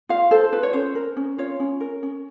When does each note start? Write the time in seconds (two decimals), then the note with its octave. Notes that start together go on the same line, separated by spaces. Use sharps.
0.09 F4 F5
0.31 A4 C5
0.52 F4 B4
0.63 C#5
0.73 C#4 C5
0.95 A#4
1.17 C#4
1.38 F4 C#5
1.60 C#4
1.80 A#4
2.03 C#4